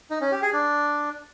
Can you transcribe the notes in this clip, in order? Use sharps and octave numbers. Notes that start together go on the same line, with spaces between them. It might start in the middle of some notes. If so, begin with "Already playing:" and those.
D#4
C#4
G4
G#4
D4